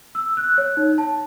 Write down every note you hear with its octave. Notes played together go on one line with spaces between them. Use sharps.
E6
F#6
C#5
D#4
A5